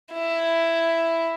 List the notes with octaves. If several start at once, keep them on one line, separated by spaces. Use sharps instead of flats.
E4